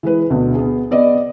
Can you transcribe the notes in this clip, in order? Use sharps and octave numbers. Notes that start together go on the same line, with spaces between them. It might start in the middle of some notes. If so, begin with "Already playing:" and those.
E3 G#3 G#4 B4
D2 B2
B3 G#4
B3 D5 D#5